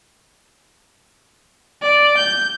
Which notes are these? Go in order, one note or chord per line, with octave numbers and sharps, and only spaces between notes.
D5
G6